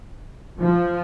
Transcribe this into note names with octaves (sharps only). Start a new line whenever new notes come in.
F3